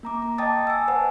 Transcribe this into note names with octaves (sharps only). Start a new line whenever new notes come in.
A#3 A#5 D6
A#5
D#5 G5 A5 D6 D#6 A6
G#5 E6
B4 C5 F#5 A5